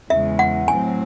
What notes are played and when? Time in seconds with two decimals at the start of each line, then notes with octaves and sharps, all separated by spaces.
0.10 E2 C#3 G#3 E5
0.39 F#5
0.68 A2 F#3 C4 G#5